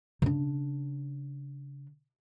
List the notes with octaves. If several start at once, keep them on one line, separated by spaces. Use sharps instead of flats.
C#3 D4